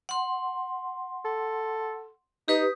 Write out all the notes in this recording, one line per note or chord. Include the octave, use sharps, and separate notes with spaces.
F#5 C6
A4
D#4 G4 B4 D#6